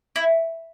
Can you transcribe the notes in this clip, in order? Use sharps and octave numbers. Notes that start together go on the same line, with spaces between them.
E4